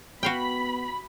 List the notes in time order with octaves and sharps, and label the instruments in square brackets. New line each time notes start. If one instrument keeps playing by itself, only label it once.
[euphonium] B3 [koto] F#4 F5 G5 [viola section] B5